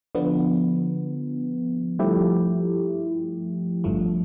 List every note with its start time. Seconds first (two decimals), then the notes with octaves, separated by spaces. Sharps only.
0.15 D3 F3 B3
1.99 G2 F3 A3 E4 G4
3.84 G1 G2 F3 A3